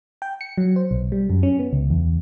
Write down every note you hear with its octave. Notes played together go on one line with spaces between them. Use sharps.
G5
C#7
F#3
C5
B1
G3
F#2
C#4
B3
C#2
E2